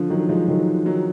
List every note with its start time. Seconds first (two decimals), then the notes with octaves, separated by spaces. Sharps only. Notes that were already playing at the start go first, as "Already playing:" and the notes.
Already playing: D3 F3
0.10 D#3 F#3
0.29 F3 G#3
0.48 D#3 F#3
0.85 D#3 F#3